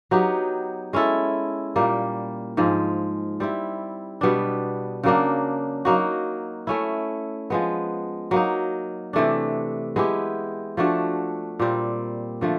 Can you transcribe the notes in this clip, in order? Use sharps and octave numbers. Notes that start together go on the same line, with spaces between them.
F#3 B3 D#4 G4
G#3 C#4 E4 A4
A#2 G3 A#3
G#2 F3 G#3
G3 C4 E4
B2 G3 B3 D4
C#3 F#3 A#3 D4
F#3 A#3 D#4 F#4
A3 C#4 E4
F3 G#3 B3
F#3 A#3 D#4
C3 E3 A3 D4
G#3 B3 E4 G4
F3 A3 D4 F#4
A#2 G3 C4
D3 F3 A3